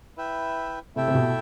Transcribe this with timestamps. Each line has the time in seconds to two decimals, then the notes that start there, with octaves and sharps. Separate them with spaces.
0.17 E4 B4 E5 G5
0.95 C3 A3 E4 A4 E5 G5
1.08 C3
1.14 B2